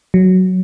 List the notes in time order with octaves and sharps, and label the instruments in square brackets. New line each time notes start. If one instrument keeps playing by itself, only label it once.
[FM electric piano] F#3